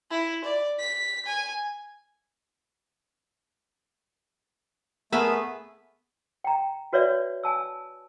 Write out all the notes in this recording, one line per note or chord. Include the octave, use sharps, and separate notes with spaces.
E4
D5
B6
G#5
A3 B3 G#4 A#4 B4 E5 E6
G5 A#5
F#4 B4 C#5 D5 E5
G#5 A5 E6